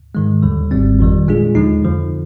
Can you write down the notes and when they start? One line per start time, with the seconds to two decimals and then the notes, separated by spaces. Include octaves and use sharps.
0.15 G#2 D#3 G#3
0.42 D#2 D3 G3
0.71 G#1 G#2 G3 C4
0.99 G1 F2 D#3 G3
1.28 A#2 G#3 D4 F4 G#4
1.55 D#2 D3 F3 G#3 D#4
1.84 F2 D3 F3